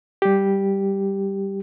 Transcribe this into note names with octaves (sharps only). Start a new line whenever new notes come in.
G3 G4